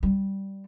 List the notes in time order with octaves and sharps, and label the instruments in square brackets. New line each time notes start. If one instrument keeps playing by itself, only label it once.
[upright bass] G3